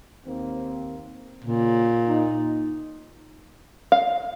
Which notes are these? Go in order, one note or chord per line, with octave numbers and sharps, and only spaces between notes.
D#2 A#3 C4
A#2 C#3
D#4
F5